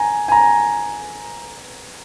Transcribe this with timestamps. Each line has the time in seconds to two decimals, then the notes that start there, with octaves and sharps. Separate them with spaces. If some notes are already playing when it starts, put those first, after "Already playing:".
Already playing: G#5 A#5
0.28 G#5
0.32 A#5